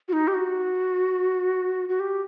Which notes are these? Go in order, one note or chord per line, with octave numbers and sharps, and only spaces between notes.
F#4
D#4
G4
F#4
F#4
G4